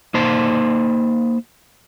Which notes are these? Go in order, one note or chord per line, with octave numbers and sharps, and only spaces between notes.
A#3 D#4 C5 A5